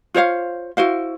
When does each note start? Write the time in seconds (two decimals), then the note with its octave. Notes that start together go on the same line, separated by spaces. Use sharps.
0.14 F4 C5 C#5 F5
0.77 E4 F#4 C5 F5